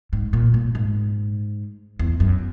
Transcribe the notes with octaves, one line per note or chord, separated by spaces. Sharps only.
G#2
A#2
A#2
G#2
E2
F#2